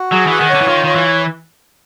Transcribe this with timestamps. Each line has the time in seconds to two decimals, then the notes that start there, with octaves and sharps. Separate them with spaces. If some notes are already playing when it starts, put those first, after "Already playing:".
Already playing: F#4
0.12 F#3 G#4
0.27 E3 F#5
0.40 D#3
0.50 D3 C#5
0.61 E3
0.68 D#3 F4
0.84 D#3 C#5
0.96 E3